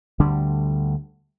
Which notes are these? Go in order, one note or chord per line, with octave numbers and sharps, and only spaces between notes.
D2 D3 G3 D4